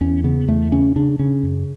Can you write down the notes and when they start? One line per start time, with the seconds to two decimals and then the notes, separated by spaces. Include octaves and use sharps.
0.01 E2 C#4
0.24 C#3 B3
0.48 E2 A3
0.72 C#3 C#4
0.96 C#3 D4
1.19 C#3 C#4
1.43 F#2